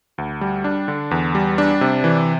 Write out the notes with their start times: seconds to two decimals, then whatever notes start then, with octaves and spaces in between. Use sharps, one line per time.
0.18 D2
0.41 G3
0.64 D4
0.88 D3
1.11 E2
1.35 G3
1.58 D4
1.81 C3
2.04 E3